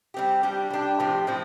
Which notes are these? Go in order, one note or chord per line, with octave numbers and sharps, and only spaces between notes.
G3 C4 G4
G3 D4 G4
G3 D4 G4
A2 F3 C4 G4
A2 F3 C4 G4